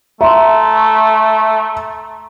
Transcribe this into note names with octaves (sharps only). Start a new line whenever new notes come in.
A3 E5 A#5 C6